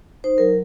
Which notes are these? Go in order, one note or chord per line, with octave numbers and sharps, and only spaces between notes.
D#4 C5
F#3 A#4